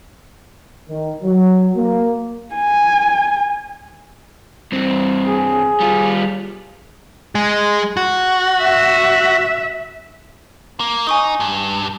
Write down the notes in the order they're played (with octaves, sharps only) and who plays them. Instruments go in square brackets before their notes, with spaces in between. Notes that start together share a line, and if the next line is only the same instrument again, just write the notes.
[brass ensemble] D#3
F#3
A#3
[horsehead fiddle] G#5
[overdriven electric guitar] G2 C4
[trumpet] G#4
[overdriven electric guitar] G3 F4
[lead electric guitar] G#3 G#4
F#4
[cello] E5
[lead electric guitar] A#3
[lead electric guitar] D#4 [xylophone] G#5 C#6 D#6
[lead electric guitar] G2